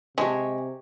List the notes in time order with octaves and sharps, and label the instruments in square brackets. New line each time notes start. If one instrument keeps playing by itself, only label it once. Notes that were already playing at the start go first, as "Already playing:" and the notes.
[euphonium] C3 [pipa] G#3 [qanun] G4 C#5 E5